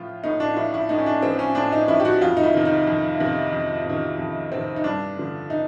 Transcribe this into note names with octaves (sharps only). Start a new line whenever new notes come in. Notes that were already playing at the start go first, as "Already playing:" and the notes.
Already playing: A2 F3 F4
A2 D#4
D4
F3 E4
E4
A2 D#4
C#4
D4
F3 C4
C#4
A2 D4
D#4
F3 E4
G4
F#4
F2 F4
D#4
E4
C3 D#3
D#4
F2
C3 D#3
F2
C3 D#3
F2
C3 D#3 C4
D#4
G2 D4
D3 F3
D#4